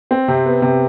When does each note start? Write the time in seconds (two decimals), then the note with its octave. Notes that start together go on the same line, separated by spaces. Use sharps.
0.11 C4
0.28 C3
0.46 B3
0.62 C3